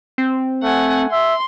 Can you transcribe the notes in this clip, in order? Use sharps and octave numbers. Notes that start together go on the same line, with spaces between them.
C4
A3 F#5 G#5
E5 C6